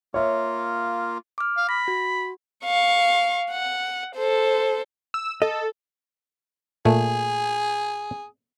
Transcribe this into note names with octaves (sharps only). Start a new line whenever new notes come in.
A#3 F4 C#5 E5
D6 F6
F5
B5 A#6
F#4
F5 C#6
F#5
A4 C5
E6
A4 D#5
A#2 A3 G#4